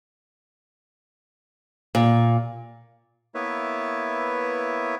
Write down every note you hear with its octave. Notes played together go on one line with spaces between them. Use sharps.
A#2
A#3 B3 E4 B4 C#5 E5